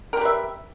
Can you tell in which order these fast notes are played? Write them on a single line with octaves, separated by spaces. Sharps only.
A#4 G4 B4 E5